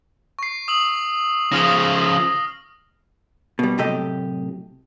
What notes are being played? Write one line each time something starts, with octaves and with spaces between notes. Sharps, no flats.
C#6 C7
D#6 E6 F#7
C#3 F3 D#6 F6 A#6
B2 G3
F#2 A2 C3 A3 G4 D#5